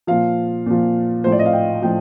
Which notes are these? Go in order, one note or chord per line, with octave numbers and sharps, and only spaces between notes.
A#2 F3 F5
A#2 F3
A2 F3 C5
D5
D#5
F5
G5
A2 F3 G5